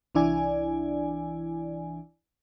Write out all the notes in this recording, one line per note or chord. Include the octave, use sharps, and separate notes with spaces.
C2 E3 D4 E4 D5 G#5